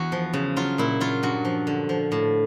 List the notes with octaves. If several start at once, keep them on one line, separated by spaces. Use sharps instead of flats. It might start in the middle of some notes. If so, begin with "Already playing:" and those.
Already playing: E2 F#4
F3
C#3
F#3 F4
A#2 E4
F#3 F4
G2 F#4
F3
D3
F3
A2